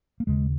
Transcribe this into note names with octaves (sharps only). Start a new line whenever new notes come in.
A#3
D#2 C#3 G#3